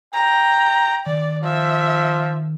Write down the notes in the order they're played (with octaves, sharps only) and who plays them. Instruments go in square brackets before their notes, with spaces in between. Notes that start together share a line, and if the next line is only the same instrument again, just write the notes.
[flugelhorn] G5 [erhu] A#5
[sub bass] D#3 [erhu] D5
[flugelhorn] F3 [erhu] E5